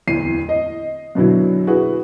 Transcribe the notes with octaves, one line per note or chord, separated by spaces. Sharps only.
D1 E2 C7 D#7
D#5
F#2 B2 D3 F#3 E4
E4 F#4 G#4 B4